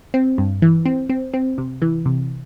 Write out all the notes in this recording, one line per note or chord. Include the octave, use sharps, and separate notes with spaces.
C4
G2
E3
C4
C4
C4
C3
E3
C3